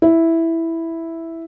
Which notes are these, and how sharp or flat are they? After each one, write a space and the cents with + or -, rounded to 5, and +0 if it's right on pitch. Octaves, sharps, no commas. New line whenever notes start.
E4 +0